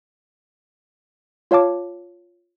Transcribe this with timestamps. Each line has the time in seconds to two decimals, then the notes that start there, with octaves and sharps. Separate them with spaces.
1.51 F4 C#5 F5 A5 D6